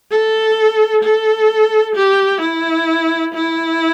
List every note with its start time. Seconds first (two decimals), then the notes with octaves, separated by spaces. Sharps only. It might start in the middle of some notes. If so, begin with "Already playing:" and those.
0.11 A4
1.03 A4
1.95 G4
2.41 E4
3.34 E4